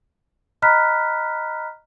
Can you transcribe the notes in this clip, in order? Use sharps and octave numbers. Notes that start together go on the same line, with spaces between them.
D#5 A#5 B5 F6 F#6 B6